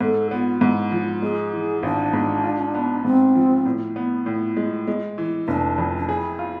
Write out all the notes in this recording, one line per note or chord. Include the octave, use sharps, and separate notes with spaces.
G#2 A4
B3 F4
G#2 E4
F3
F4
G#3 G#4
E3
G#1 D4
G#2
F4
B3
G#2 C4
F3
A2
B3
A2
G#3
G#3
E3
F1 D4
F2
D4
E4 G#4
F4